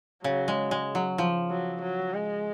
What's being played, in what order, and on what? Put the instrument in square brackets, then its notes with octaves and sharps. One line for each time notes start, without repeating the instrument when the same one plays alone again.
[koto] C#3 [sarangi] F#3
[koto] G#3
G#3
F#3
F3
[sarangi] F#3
F#3
G#3